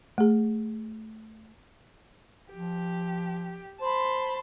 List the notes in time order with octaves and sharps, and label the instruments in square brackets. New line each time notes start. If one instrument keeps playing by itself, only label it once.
[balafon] A3 G#4
[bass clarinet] F3 [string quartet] G4
[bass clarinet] C5 [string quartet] A5 B5 C6